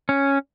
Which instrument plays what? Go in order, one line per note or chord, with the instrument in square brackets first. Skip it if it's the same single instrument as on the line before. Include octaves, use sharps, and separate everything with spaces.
[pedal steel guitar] C#4